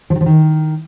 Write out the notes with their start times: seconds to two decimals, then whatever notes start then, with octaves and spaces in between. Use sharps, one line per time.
0.10 F3
0.15 D#3
0.21 F3
0.26 D#3